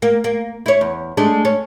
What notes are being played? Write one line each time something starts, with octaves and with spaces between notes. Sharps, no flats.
A#3
A#3
E4 C#5
E2
G#3 A3 D4
C#4